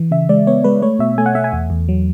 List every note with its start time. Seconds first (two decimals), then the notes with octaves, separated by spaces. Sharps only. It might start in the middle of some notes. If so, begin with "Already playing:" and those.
Already playing: E3
0.11 C#3 E5
0.29 G#3 D5
0.47 B3 C#5
0.64 G#3 B4
0.82 A3 C#5
0.99 B2 E5
1.18 A3 G#5
1.26 F#5
1.35 A3 E5
1.44 G#5
1.53 E2
1.70 E2
1.89 F#3